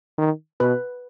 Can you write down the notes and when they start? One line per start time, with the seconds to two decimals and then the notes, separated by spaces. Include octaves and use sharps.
0.18 D#3
0.60 B2 B4